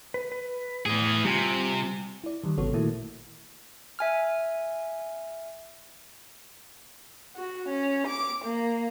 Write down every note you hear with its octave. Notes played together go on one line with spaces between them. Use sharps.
B4
B4
A2 E3 G#4
C3 G3 F4 G#5
E4 D5
D#3 E3 G3
G#1 C#3 B3 F#4 A4 C#5
A#2 D#3 A3 A#3 E4
E5 G#5 F6
F#4
C#4
D6
A#3